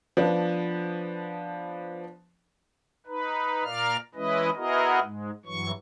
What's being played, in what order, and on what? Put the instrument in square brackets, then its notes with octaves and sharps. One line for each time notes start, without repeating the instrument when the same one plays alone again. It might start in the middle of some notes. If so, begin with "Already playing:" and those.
[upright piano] F3 B3 D4
[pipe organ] D#4 B4
A#2 A#4 D5 F5 F6
E3 G#3 C#4 E4 B4 D#5
B3 E4 F#4 G#4 A#4 D#5
G#2 G#3
G2 E3 F#3 C#6